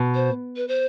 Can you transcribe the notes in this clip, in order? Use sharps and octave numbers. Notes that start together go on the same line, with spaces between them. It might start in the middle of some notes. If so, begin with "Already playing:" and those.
Already playing: B2
C5
B4
C5